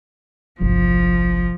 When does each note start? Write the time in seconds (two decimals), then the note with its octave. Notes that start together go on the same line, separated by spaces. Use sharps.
0.61 G1 C2 F3